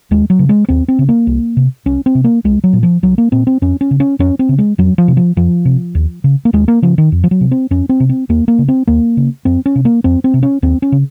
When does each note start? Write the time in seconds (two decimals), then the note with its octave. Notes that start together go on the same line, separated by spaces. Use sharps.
0.11 D#2 G#3
0.30 F#3
0.39 C#3
0.49 G#3
0.69 D#2 C4
0.88 C4
0.99 C#3
1.09 A#3
1.27 C2
1.57 C3
1.86 C2 C#4
2.06 C4
2.15 C3
2.24 A#3
2.44 C2 G#3
2.64 F#3
2.73 A#2
2.83 F3
3.03 C2 F#3
3.18 A#3
3.32 A#2 C4
3.47 C4
3.62 F2 C#4
3.81 C#4
3.91 C#3
4.00 C#4
4.19 F2 C#4
4.39 C4
4.49 C#3
4.58 G#3
4.78 F2 F#3
4.98 F3
5.08 C3
5.17 F3
5.37 F2 F3
5.65 C3
5.95 D#2
6.24 C#3
6.45 A#3
6.53 D#2 G#3
6.68 A#3
6.82 C#3 F3
6.98 D#3
7.12 F2
7.24 F3
7.31 F#3
7.41 C3
7.51 C4
7.71 F2 C#4
7.89 C4
8.00 C3
8.09 C4
8.29 D#2 A#3
8.48 A#3
8.59 C#3
8.68 C4
8.87 D#2 A#3
9.17 C#3
9.45 F2 C4
9.66 C#4
9.76 C3
9.85 A#3
10.04 F2 C4
10.24 C4
10.34 C3
10.43 C#4
10.62 D#2 C4
10.82 C#4
10.92 C#3